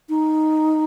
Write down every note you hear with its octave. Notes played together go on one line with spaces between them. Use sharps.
D#4